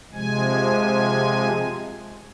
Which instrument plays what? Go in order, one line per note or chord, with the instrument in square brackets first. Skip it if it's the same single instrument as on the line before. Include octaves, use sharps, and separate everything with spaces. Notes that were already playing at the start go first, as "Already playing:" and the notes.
[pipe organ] C3 F3 G#3 G#5